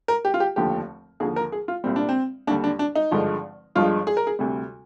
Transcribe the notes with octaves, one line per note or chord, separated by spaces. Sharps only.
A#4
G4
F4
G4
F1 D#2 D3 F3 G4
D#2 D3 F3 G#4
A#4
G#4
F4
C2 A#2 G3 C4
D4
C4
D#2 D3 G3 D4
D4
D4
D#4
G#1 G2 D3 F3 G#3
G1 G2 F3 G#3 F4
G#4
A#4
G#4
D2 C3 G3